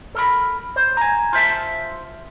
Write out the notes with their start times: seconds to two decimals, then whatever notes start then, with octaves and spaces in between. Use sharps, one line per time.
0.15 A4 A#4 B5
0.76 C5
0.97 G#5 A#5
1.33 F4 C5 E5 A5